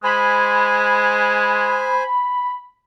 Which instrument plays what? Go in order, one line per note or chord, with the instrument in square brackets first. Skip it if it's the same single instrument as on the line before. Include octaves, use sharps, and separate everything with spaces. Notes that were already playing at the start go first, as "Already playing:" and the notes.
[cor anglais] G#3 [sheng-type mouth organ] C5 G#5 [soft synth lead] B5